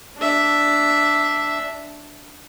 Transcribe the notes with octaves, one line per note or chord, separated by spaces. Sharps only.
D4 E5